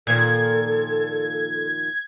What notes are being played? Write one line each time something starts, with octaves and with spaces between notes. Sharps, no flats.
A#2 D#3 F3 A4 G#6